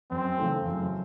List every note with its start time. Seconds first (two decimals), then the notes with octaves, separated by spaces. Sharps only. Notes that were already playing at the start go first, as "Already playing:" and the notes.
0.10 F#2 C4
0.38 C#3 E3 A3
0.66 F#2